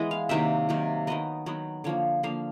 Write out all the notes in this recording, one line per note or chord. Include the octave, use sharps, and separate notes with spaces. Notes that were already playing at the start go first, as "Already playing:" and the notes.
Already playing: E3 G#3 B3 D#5
F5
C3 D#3 F#3 A#3 E5
C3 D#3 F#3 A#3
D#3 F#3 B3 D#5
D#3 F#3 B3
D3 F3 A#3 C#5
D3 F3 A#3 F5